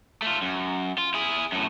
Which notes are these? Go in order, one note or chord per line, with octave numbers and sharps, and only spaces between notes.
A3 F4
F#2
F4
E4 G#4
F#2 A2